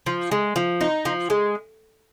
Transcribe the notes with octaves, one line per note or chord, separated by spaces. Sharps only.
F3
G#3
F3
D#4
F3
G#3